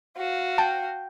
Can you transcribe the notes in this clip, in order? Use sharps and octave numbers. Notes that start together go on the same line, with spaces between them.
F#4 F5
G5 A5